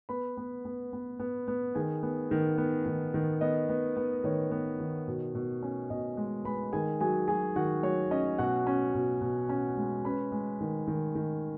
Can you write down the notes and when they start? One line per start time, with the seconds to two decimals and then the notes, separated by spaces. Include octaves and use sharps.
0.09 B3 B4 B5
0.37 B3
0.65 B3
0.93 B3
1.19 B3
1.48 B3
1.75 D#3 G#4 G#5
2.03 B3
2.31 D#3
2.58 B3
2.86 D#3
3.14 D#3
3.41 B3 D#5
3.69 B3
3.97 B3
4.24 D#3 C#5
4.51 B3
4.80 D#3
5.08 B2
5.35 B2
5.63 C#4
5.90 B2 D#5
6.17 G#3
6.45 G#3 B4 B5
6.72 D#3 G#4 G#5
7.00 F#3 G#4 G#5
7.28 F#3 G#4 G#5
7.56 D#3 F#4 F#5
7.83 F#3 C#5
8.11 C#4 D#5
8.38 B2 F#4 F#5
8.67 C#4
8.95 B2
9.21 B2
9.49 C#4
9.77 G#3
10.05 C#4 B4 B5
10.32 G#3
10.61 D#3
10.88 D#3
11.15 D#3